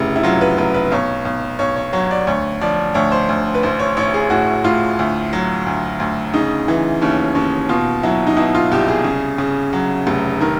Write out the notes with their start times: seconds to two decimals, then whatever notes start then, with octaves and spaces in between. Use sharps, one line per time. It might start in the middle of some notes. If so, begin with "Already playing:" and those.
Already playing: F1 C#3 E4
0.16 E4
0.23 F#3 F4
0.41 B4
0.58 F1 B4
0.74 B4
0.92 B1 C#5
1.25 B1
1.59 B1 C#5
1.76 C#5
1.93 F#3 C#5
2.11 D5
2.27 D2 C#5
2.61 F3 D5
2.94 D2 C#5
3.12 C5
3.29 D2
3.55 B4
3.63 A1 C5
3.79 C#5
3.97 A1 C#5
4.14 G#4
4.30 A2 F#4
4.64 A2 F4
4.99 D2
5.33 F#3
5.66 D2
6.00 D2
6.34 C#3 D#4
6.68 E3
7.02 D#2 C#4
7.35 D#2 C#4
7.69 B2 F4
8.03 F#3 E4
8.27 D#4
8.37 B2 E4
8.55 F4
8.72 C2 G4
8.88 G#4
9.04 C#3
9.38 C#3
9.73 F#3
10.07 F1
10.40 D#3 A#4